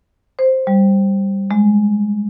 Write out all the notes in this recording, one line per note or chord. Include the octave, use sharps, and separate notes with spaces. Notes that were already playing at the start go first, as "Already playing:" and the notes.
C5
G3
G#3